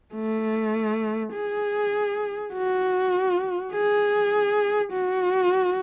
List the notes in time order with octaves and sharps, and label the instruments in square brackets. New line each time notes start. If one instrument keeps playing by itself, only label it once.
[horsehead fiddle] A3
G#4
F#4
G#4
F#4